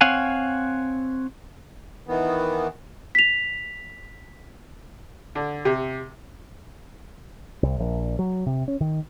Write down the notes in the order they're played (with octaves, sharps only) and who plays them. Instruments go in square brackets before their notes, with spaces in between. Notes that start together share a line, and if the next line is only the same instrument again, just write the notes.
[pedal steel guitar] C4 C#5 F5 F#5 G#5
[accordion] D#3 E3 B3
[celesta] B6 F7
[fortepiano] D3
C3
[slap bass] C2
A#1
F#3
C3
C#4
D#3